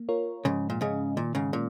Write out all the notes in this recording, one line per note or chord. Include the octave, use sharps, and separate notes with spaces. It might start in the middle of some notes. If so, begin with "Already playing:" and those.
Already playing: A#3
F4 A#4 C#5
G#2 C#3 F3
A#2
G#2 C#3 C#4 G#4 D#5
A#2 D#3
G#2 C#3
A#2 G#3 C#4